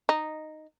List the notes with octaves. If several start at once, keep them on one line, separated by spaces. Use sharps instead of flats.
D#4